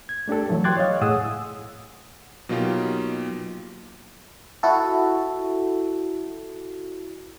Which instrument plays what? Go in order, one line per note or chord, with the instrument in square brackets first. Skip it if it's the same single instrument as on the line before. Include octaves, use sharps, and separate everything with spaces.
[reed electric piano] G#6
A3 D4 G4 A4
E3 F#3 A3
G5 C6 D6 F#6 G#6 A6
C#5 D#5 F5
A2 G#4 F#5 G#5 D#6 E6
[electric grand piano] B2 F#3 A#3 D#4 F4 G4
[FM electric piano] E4 F#4 A4